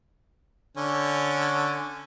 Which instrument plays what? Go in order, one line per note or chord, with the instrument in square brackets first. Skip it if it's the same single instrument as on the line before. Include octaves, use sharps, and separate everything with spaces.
[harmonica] D3 C#4